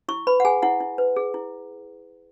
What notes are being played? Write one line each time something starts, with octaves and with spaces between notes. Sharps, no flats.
E4 C#6
B4 B5
F#5
G#4 G#5
E4 F#5
E4
B4
G#4
E4